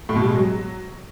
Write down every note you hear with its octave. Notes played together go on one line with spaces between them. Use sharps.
A2
B2
G3
G#3
F#3